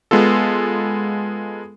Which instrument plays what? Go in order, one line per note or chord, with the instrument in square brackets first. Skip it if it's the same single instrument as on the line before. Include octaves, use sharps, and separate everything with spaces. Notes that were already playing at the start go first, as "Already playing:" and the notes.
[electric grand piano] G#3 B3 F4 A4